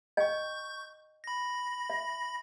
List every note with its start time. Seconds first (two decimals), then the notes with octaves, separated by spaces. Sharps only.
0.17 D#5 G5 C#6 G6
1.24 B5 A#6
1.90 E5